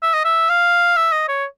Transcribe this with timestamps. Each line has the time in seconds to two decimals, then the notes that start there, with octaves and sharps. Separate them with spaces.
0.02 E5
0.14 D#5
0.25 E5
0.49 F5
0.96 E5
1.12 D#5
1.29 C#5